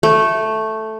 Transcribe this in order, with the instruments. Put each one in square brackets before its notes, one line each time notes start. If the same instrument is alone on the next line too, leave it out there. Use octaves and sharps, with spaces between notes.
[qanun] A3